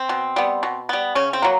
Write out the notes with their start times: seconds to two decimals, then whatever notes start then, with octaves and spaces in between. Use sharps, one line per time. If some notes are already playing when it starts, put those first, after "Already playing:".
Already playing: C4
0.09 B2
0.36 G3 B3
0.63 B2
0.89 G3 B3
1.15 C#3 C#4
1.33 C4
1.42 F#3 A#3